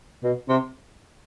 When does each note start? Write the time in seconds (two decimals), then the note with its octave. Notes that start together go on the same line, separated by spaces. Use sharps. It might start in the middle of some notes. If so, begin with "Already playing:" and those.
0.24 B2
0.49 C3